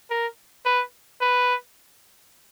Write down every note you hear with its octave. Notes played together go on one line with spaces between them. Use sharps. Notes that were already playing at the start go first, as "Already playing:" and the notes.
A#4
B4
B4